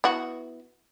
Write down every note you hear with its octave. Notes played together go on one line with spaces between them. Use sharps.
B3 E4 F#4